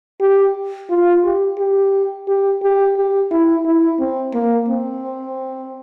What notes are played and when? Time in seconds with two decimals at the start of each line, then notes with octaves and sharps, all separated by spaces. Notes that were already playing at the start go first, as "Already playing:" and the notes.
0.21 G4
0.90 F4
1.24 G4
1.58 G4
2.28 G4
2.62 G4
2.96 G4
3.31 E4
3.66 E4
4.00 C4
4.34 A#3
4.68 C4